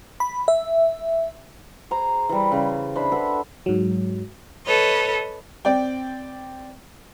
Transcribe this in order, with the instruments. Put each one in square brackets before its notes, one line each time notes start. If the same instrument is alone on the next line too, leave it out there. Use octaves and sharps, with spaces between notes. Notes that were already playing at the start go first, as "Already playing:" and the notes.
[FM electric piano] B5
E5
[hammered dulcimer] G#4 C5 A#5
E3 G3
C#3
D4 C5 E5 B5
A4 B4 E5 F#5
[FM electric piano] G#2 F#3
[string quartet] A4 B4 C#5 D#5
[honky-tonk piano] C4 D5 G5